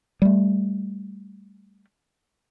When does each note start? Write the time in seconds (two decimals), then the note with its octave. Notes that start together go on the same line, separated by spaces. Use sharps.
0.22 G3 A3